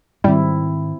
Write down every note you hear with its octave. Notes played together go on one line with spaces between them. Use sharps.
G#2 D#3 G3 C4 E4